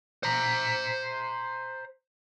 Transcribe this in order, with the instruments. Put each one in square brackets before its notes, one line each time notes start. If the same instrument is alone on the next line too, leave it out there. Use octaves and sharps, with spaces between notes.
[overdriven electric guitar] C5 A#5